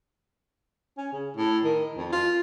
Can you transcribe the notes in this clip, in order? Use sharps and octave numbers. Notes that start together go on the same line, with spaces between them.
C#4
C#3
A2
D#3
F2
F4